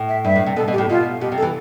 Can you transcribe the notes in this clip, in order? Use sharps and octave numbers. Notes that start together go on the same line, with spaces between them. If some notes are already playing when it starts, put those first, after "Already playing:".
Already playing: A2
E5
G2 E5
A2
C3
B2 A4
B2
G4
A2
B2 F4
B2 G4
C3
A4
E3